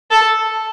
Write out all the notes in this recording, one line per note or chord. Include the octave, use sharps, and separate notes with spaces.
A4